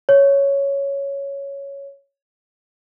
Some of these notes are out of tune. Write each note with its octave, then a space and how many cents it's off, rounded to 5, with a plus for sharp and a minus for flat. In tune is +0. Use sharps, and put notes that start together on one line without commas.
C#5 +5